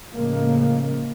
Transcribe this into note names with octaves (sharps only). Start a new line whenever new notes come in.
A2 C#3 F3 G#3 A#3